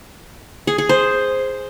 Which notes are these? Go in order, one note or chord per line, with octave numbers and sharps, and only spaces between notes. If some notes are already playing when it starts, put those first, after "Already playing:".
G#4
G#4
C5